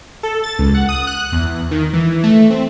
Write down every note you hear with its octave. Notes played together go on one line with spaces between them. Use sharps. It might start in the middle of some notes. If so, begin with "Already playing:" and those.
A4
A6
C#2
F#5
D#6
F#6
E2
D#3
E3
A3
C4